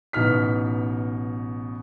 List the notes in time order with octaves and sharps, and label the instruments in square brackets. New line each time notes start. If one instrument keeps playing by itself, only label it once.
[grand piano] A1 B2 D#4 F6 B6